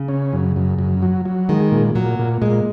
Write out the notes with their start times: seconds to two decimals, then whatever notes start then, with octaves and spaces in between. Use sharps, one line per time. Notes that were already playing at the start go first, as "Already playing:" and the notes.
Already playing: C#3
0.08 C#4
0.33 F#2
0.56 F#2
0.79 F#2
1.02 F#3
1.26 F#3
1.49 D#3 G#3
1.72 A#2
1.95 A#2 F#3
2.19 A#2
2.42 A#2 G#3